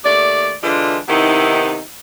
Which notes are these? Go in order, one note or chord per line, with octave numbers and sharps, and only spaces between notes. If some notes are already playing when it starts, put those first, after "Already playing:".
D#2 A3 D5
D3 E3 G#3 D4 F4
C3 D#3 B3 D#4 E4